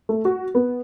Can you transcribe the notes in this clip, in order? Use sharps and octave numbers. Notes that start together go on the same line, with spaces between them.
A3
F#4
B3